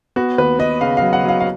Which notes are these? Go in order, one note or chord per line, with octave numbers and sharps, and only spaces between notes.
B3 F#4
D#2 B4
B3 D#5
C#3 F5
F#3 F5
F#5
F#3 F5
F5